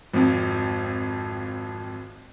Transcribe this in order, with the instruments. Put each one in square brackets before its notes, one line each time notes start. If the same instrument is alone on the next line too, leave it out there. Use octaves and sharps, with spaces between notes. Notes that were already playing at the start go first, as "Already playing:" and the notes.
[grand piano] G#1 F2